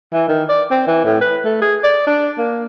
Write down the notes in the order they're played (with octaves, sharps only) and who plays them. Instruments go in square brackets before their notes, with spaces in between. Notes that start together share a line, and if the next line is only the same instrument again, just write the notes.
[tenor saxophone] E3
D#3
D5
C4
E3
A2
B4
A3
G#4
D5
D4
A#3